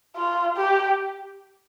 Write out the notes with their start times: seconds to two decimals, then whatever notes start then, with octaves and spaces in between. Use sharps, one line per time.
0.16 F4
0.57 G4